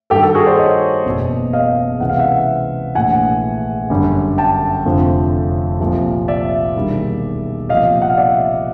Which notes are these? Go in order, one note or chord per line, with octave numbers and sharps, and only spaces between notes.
G2 D#3 G3 G4 A4
G4 A4
F#4 G#4
C5 D5
C#5 D#5
F#1 E2 B2
D#5 F5
C#2 C3 E3 F#5
F5
E5 F#5
A#1 A2 E3 F#5 G#5
G1 F#2 D3 G3
G5 A5
F1 F2 D3 F3
C2 A#2 F3
D5 E5
E1 D#2 D#3 G3
C2 A#2 F3 D#5 F5
F#5
F5
D5 E5